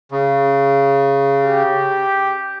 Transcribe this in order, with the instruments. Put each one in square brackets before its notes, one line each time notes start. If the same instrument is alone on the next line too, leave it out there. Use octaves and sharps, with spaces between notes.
[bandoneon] C#3
[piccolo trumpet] G4